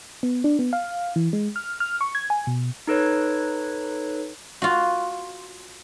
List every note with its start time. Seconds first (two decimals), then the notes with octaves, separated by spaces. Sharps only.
0.23 B3
0.44 D4
0.59 B3
0.73 F5
1.16 E3
1.33 G#3
1.56 F6
1.80 F6
2.01 C#6
2.15 G#6
2.30 G#5
2.47 B2
2.87 D#4 A4 B4 C#5
4.62 F4 F#4